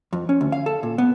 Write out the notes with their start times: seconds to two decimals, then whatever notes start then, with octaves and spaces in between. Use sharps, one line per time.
0.13 F2
0.29 C#4
0.41 D2
0.52 F5
0.66 A4
0.83 A#2
0.98 B3